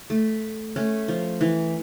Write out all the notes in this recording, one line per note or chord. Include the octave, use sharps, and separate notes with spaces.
A3
A3 C#4
F3
E3